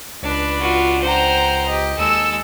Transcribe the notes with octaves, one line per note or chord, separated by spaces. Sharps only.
C#2 D4 B4
F4 F#4
C5 F#5 G5 A#5
G4 D#5
D#2 G#3 A4 E6